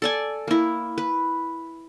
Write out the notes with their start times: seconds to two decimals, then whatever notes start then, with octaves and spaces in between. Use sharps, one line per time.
0.02 A4 D5 G#5
0.48 A#3 E4
0.98 B4